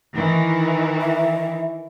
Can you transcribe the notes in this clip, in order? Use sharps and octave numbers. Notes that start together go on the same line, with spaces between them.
D#3 E3
E5